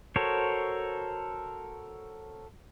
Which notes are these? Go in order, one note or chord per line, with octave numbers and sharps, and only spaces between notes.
F#4 A4 A#4 C5 C#5